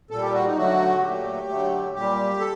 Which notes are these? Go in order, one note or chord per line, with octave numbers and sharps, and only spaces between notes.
A#2 G3 A4
G4
F#4
D#4
D3 F#3 A3 F#4
A#2 F#3 A3 G4
D3 F#3 A3
A#2 G3 G4
A4